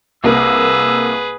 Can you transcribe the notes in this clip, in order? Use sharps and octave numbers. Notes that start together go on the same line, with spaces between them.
C2 A#3 G#4 B4 E6